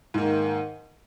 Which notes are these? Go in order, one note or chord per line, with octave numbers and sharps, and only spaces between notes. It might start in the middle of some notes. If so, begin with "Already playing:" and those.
G#2 D#3 A#3